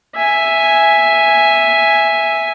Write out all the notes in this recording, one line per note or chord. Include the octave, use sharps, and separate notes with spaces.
E5 G#5